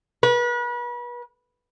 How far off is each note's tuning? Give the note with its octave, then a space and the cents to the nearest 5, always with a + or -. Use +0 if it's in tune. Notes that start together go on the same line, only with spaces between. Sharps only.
B4 -35